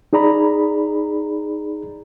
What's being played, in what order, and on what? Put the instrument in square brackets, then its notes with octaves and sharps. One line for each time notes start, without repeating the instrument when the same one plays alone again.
[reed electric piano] D#4 G#4 D5 A#5 B5